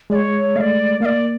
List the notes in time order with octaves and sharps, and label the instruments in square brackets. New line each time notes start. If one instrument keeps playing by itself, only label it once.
[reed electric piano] G#3 [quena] D5
[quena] C#5
[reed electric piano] A3 [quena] F5
[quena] D5
[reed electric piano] A#3 [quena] F5
[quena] D5